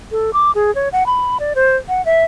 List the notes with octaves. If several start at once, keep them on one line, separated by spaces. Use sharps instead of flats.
A4
D6
G#4
C#5
F#5
B5
D5
C5
F#5
E5